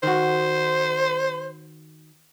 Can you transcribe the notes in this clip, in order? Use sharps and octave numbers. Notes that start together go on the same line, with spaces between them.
D#3 F#4 C5